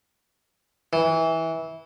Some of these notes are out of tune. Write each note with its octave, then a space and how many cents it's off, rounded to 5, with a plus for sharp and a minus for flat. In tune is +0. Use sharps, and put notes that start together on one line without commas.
E3 -20